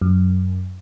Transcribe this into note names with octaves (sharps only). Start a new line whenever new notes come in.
F#2